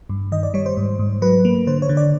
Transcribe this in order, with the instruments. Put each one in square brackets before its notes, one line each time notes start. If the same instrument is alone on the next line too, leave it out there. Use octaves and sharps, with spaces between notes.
[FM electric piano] G2
D#3 D#5
D5
G3 C#5
C5
G#2
G#2
F#3 B4
A#3
D3 C5
C#5
D3
D5